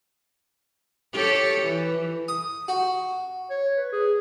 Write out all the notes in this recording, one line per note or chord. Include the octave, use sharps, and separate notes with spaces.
G4 A4 C#5
E3
D#6
F#4
C#5
B4
G#4